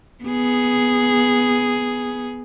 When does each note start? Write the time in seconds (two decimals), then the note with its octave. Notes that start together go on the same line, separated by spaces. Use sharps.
0.25 B3 G#4